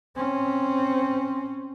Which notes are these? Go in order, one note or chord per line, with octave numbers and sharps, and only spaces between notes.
C4 C#4